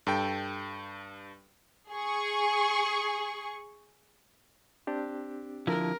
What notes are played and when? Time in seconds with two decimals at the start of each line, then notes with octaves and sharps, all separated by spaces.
0.07 G2 A4 G5
1.91 G#4 C#6
4.87 C4 D4 G4
5.67 D3 F3 E4 A#4